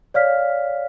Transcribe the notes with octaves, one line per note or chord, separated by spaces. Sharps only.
C#5 D5 F5 F6 B6